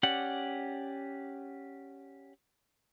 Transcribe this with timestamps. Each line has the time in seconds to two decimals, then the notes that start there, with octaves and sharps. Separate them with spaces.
0.03 C#4 G4 D5 F#5